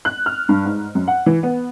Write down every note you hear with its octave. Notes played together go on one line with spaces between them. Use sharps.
F#6
F6
G2
G#2
F#2
F#5
E3
B3